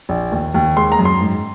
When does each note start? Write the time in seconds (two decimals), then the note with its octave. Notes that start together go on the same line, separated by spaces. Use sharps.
0.09 A#1
0.32 D#2
0.54 D#2
0.76 G#3 C6
0.92 A#5
0.99 F#2
1.05 C6
1.21 G#2